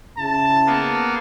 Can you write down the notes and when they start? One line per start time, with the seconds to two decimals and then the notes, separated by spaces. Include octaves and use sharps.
0.18 C#3 E4 A5
0.66 A#3 B3